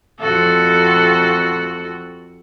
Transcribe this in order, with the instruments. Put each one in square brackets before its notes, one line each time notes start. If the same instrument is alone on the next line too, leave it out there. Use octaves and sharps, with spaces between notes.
[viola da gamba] F2 F#4 A4